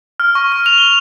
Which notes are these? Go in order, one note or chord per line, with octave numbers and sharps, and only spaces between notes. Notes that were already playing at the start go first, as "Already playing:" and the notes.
F6
C#6
F6
F7
G7